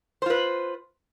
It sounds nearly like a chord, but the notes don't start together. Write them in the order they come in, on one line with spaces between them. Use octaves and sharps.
C5 F4 B4